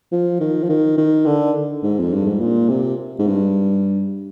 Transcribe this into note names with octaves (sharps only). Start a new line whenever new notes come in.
F3
D#3
F3
D#3
D#3
D3
G#2
F2
G2
G#2
A#2
C3
G#2
G2